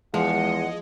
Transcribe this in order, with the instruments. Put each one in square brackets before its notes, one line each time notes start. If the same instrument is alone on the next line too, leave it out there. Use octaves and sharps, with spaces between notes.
[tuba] E2 [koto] F3 [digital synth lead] G#3 [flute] F#5